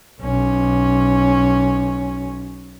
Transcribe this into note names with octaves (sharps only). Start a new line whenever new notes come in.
B1 C#4